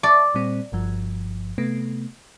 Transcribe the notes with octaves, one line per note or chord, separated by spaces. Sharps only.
D5 E5 A5 C#6
A#2 G3 C4
G1 G2 F3
C3 A3 B3